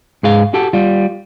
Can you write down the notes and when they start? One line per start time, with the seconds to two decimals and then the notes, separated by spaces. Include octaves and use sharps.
0.23 G#2 G#4 F5
0.54 F#4 G4 A4
0.73 G3 F4